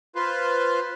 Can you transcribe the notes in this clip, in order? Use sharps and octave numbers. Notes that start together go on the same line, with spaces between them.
F4 B4 C5